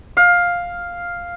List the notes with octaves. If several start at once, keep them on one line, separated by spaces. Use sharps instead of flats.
F5